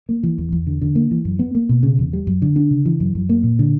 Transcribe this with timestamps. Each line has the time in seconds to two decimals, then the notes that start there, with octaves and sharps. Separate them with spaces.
0.09 A#3
0.23 E3
0.38 E2
0.52 E2
0.67 D3
0.81 D3
0.95 A#3
1.11 E3
1.25 F#2
1.39 B3
1.55 A#3
1.69 B2
1.83 C#3
1.99 E2
2.13 G3
2.27 F#2
2.42 D3
2.56 D4
2.71 C#3
2.86 E3
3.00 F#2
3.15 F#2
3.29 A#3
3.43 A#2
3.59 D3